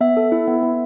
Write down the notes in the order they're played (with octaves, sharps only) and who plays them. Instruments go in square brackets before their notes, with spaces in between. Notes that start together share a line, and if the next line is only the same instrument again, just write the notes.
[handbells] B3 E5
A4
E4
B3
B3